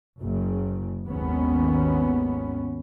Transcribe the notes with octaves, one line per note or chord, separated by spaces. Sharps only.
F#1 C#3
G#1 D#2 B3 C#4